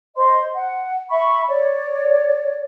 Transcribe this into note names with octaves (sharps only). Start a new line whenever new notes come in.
C5 D#5 C6
F#5
E5 B5 C#6
C#5 D5